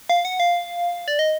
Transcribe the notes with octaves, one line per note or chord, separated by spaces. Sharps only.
F5
F#5
F5
D5
D#5